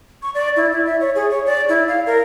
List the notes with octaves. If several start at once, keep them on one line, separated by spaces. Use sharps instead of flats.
C#6
D5
E4
E4
E5
C#5
G#4
C#5
D5
E4
F5
A#4